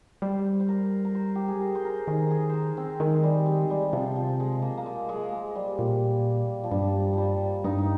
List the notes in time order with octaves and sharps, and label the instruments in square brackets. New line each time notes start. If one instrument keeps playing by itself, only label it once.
[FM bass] G3 [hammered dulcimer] C5
[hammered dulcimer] C5
A#4
A#4
C5
G4
G#4
A#4
C5
A#4
[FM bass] D#3 [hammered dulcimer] G#4
[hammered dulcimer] G#4
A#4 C5
C4
[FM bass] D#3 [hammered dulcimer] G#3
[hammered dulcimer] G3
G#3
G3
[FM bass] C3 [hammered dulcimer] F3
[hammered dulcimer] F3
G#3
A#3
A#3
G#3
G#3
A#3
G3
[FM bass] A#2
[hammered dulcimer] F3
[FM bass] G2 [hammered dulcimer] G3
[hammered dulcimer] F3 G3
[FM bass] G2 [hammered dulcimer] D#4
[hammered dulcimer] D#4